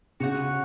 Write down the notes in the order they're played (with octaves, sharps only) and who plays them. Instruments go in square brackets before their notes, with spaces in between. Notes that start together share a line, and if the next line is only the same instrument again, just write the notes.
[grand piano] C#3 [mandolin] F#4 C#5 F#5